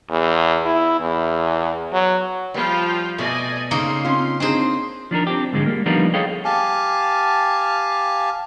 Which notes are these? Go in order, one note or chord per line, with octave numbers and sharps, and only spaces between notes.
E2
E4
E2
F#3
F3 G3 F4 G5
B2 A3 D5 D#5 G#5
C#3 A#3 D#4 C6
C4 C#4 F4
C4 D4 D#4 G#4 C5
F3 D4 D#4 A#4
C4 D4 G4
G#2 D3 F3 G#3
G3 A#3
F3 G3 A#3 B3 D4 D#4
G#4 A4 C#5 D#5 F5 G5
G4 F5 G#5 A5